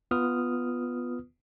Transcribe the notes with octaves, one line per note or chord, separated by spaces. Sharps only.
B3 F4 B4 D#6 F6